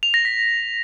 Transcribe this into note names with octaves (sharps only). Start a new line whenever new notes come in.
F7
A#6
B6